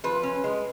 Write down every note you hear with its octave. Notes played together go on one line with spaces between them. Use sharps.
F3 B4
C#4
G#3